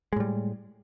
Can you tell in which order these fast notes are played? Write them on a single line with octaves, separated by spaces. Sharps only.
G#3 A2 G3